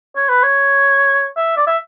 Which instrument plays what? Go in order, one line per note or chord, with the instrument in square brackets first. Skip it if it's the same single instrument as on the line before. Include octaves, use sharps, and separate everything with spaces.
[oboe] C#5
B4
C#5
E5
D5
E5